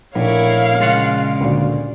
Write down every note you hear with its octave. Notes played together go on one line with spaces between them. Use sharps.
A#1 A2 E4 A#4 C#5 F5
C#3 G#3 F4 F#5
D2 A#2 F#4